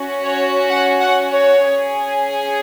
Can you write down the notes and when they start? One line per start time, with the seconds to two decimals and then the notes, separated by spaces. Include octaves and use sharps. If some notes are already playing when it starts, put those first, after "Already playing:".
Already playing: C#4 F#4
0.23 C#5
0.70 F#5
1.01 F#5
1.32 C#5
1.63 C#4 G#4